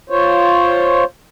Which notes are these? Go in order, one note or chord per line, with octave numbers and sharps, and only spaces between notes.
F4 C5 C#5